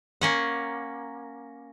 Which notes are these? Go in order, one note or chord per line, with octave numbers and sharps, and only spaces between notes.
A#3 C#4 F#5